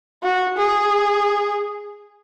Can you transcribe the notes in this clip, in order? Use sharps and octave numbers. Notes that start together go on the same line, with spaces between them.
F#4
G#4